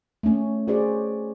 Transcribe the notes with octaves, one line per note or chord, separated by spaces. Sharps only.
A3 C#4
F#4 G#4 C5 D5